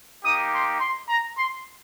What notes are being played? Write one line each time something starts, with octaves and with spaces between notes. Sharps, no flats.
A#3 D#4 G4 D#6
C6
C6
A#5
C6